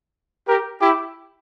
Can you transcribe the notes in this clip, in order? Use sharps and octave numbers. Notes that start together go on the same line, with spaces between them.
G4 A#4
E4 G4